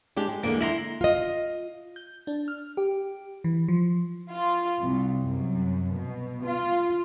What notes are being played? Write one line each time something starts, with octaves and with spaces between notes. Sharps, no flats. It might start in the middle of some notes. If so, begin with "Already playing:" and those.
G#3 D4 G4
G#3
E2 D3 G#3 A#3
E4 A#5 C6
F4 D#5
G6
D4
F6
G4
E3
F3
F4
C2
F#2
B2
F4